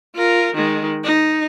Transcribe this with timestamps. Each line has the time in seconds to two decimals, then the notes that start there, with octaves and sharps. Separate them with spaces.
0.15 F4 A#4
0.55 D#3 G#3
1.04 D#4